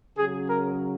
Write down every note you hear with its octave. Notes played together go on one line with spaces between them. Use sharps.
C#3 F#3 G#4
A#4